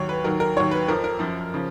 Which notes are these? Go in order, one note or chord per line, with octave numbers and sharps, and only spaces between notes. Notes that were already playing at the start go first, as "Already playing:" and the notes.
Already playing: D#2 D#3 F#3 C#5
B4
D#2 D#3 F#3 A#4
A#4
D#2 D#3 F#3 C#5
B4
F2 F3 A#4
A#4
F#2 F3
C#3 F3